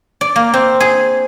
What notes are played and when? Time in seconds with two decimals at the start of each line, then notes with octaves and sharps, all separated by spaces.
0.21 D5
0.36 A#3
0.54 C4
0.80 G#4